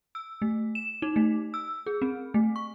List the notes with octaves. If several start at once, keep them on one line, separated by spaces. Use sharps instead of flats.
E6
A3
E7
D#4
A3
E6
G#4
C4
A3
C#6